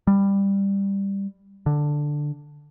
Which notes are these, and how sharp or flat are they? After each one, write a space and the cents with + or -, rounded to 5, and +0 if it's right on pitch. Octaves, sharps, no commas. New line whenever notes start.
G3 +10
D3 +5